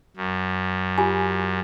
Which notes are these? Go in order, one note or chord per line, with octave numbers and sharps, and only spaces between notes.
F#2
F4 G4 G#5